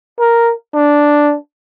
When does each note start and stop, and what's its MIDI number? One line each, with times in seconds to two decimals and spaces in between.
0.20 0.54 70
0.75 1.35 62